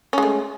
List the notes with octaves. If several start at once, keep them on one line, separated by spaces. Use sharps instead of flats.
G#3 A3 C#4